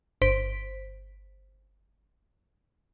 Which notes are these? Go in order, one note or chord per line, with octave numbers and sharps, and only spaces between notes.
G1 C5 B6 D7